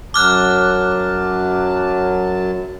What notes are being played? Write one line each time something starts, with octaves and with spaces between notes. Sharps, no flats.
F#2 F#3 A5 D6 F6 F#6